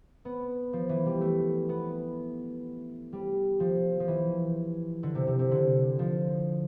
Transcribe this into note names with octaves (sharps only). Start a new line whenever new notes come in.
B3
F3
E3
G3
A3
B3
G3
F3
F3
E3
D3
C3
C3
C3
D3
F3